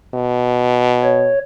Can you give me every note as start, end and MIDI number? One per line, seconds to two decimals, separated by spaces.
0.14 1.32 47
1.03 1.39 73